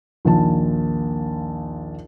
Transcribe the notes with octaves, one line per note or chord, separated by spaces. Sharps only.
A#1 D#2 A5